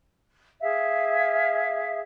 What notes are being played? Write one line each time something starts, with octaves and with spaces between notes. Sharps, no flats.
G#4 E5 F5